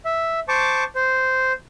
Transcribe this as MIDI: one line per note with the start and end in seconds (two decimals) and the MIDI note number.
0.05 0.40 76
0.49 0.84 72
0.49 0.84 81
0.49 0.84 85
0.49 0.84 86
0.95 1.53 72